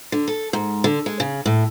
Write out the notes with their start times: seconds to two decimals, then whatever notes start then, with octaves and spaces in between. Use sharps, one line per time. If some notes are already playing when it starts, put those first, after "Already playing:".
0.12 D3
0.27 A4
0.53 G#2
0.84 D3
1.06 G#3
1.20 C#3
1.46 A2